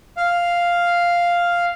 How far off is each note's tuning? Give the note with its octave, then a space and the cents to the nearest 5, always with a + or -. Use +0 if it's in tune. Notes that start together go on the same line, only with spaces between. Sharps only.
F5 +0